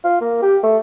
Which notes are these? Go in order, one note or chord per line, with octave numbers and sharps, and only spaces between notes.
F4
A#3
G4
A3